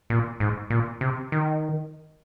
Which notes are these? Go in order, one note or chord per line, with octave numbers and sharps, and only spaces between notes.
A#2
G#2
A#2
C3
D#3